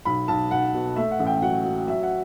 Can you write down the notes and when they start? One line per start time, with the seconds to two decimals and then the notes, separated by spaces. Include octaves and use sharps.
0.05 B1 B5
0.28 B1 A5
0.51 B1 F#5
0.74 B2
0.96 A3 E5
1.11 F#5
1.20 A1
1.26 G5
1.42 F#3 F#5
1.65 F#3
1.87 F#3 E5
2.03 F#5